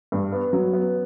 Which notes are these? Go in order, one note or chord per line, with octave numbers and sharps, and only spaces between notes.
G2
B3
F#3
B3